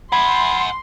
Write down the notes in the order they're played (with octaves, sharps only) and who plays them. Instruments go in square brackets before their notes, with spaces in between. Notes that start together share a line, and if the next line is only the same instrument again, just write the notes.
[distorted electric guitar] F#5 G#5 [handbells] B5 [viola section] C6